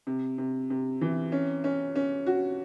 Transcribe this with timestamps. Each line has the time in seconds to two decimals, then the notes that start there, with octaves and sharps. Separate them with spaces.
0.07 C3
0.38 C3
0.70 C3
1.01 E3
1.32 C#4
1.64 C#4
1.96 C#4
2.26 F#4